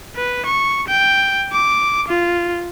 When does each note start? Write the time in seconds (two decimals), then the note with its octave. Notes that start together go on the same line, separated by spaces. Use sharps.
0.16 B4
0.46 C#6
0.88 G5
1.52 D6
2.08 F4